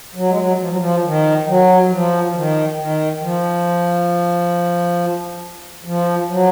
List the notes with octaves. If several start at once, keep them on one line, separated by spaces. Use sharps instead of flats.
F#3
G#3
F#3
F3
F#3
F3
D#3
F#3
F#3
F3
F3
D#3
D#3
F3
F3
F#3